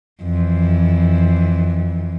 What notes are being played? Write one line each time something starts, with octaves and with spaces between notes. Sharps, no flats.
F2 E3